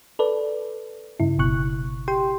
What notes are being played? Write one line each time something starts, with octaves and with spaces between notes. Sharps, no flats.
A4 B4 D5
G2 C#3 E4
G1 B2 C#6 F#6
G4 G5 C6